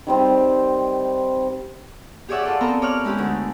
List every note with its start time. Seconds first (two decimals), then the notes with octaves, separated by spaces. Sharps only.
0.07 D#3 G3 C4 D#5
2.29 G4 G#4 C#5 D5 E5 F#5
2.43 F4 A4 D5
2.60 B3 C4 A4 A#4 A#5
2.82 C#5 D6 F6 F#6
3.04 G#3 C#4 E4 G4 G#4
3.18 D2